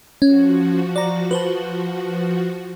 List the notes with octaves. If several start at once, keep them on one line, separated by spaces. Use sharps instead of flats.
F3 C#4 F#4
D5 A#5
B4 C5 A5